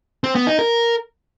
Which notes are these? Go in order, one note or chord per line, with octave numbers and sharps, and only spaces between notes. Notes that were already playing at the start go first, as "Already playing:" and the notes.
C4
B3
D#4
A#4